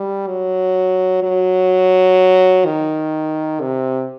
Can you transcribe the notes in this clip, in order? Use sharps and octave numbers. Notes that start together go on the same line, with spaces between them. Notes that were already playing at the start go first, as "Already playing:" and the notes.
Already playing: G3
F#3
F#3
D#3
C3